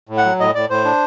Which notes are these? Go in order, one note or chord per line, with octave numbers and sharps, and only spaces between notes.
A2
F#5
F#3
A2 D#5
A2 D5
A2 C5
D4